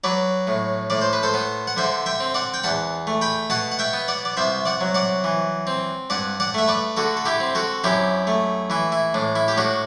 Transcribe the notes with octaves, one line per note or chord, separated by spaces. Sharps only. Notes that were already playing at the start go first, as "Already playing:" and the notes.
F#3 B4 D5
A2
A2 D5
C5
B4
A4 C5
B3
F#5
D3 C5 E5
E5 G5
C4
D5 F#5
G5
E2 F#5 A5
A3
G5 B5
B2 F#5 A5
F#5
E5 G5
B3
D5 F#5
D5
C2 C5 E5
D5 F#5
F#3
D5 F#5
E3
C4
G2 D5 F#5
D5 F#5
A3 E5
B4 D5
D3 F#4 A4
A4
E4 G4
C4
F#4 A4
F#2 E4 G4
A3
E3 E4
E4
A2 D4
E4
G4
A2 D4 F#4